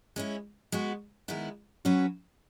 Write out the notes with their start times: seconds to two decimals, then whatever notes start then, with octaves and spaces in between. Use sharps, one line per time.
0.16 G#3 C#4 E4
0.72 G#3 B3 F#4
1.28 D#3 G#3 B3 E4
1.85 F#3 C#4 F#4 B4